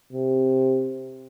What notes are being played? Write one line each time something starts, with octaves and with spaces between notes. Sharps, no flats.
C3